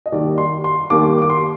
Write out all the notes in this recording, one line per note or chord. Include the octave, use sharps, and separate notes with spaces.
D#5
D#2 D#3 G3 A#3 D5
C6
C6
D#2 D#3 G3 A#3 D6
D6
C6